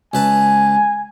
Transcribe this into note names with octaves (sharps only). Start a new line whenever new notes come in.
C#2 B4 G#5 A5